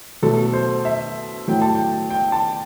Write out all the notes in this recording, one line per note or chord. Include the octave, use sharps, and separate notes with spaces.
B2 F#3 A3 A4
C5
E5
A2 F#3 A3 G5
A5
G5
G5
A5